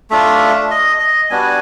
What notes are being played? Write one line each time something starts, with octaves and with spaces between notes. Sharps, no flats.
A3 D4 F4 E5
D#5
D#5
G3 B3 D4 F#4 G#5